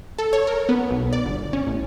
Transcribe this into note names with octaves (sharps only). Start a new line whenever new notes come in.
A4
C#5
A#4
B3
B1
D5
G1
C#4
A1